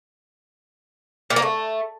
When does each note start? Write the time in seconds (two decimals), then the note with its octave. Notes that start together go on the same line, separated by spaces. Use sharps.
1.30 A#2
1.36 A#3
1.42 A3